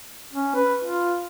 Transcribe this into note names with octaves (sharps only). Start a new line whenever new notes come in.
C#4
B4
F4